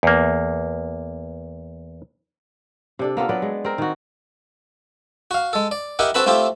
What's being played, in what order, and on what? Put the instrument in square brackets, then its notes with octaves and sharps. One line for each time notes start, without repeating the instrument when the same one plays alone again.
[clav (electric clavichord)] E2 A#3
[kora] C3 D4 A4
A#3 B3 F4 A4
F#3 B3 B4 D5
G#3
C4 A#4
D#3 F#4
[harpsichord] F#4 F5
G#3 A4
D5
E4 G4 A#4 D#5 F#5
C4 F#4 A4 B4 A5 B5
A3 C4 E4 F4 G4